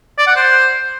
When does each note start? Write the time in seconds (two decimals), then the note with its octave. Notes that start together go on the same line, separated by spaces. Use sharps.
0.18 D5
0.27 F#5
0.36 C5